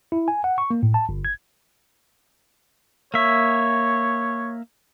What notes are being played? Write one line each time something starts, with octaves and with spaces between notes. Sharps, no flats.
E4
G#5
F#5
C#6
A#3
A2
A5
G1
G#6
A#3 C#5 E5